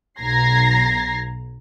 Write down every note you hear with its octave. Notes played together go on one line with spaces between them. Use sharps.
B1 A#5 G#6 A#6 C7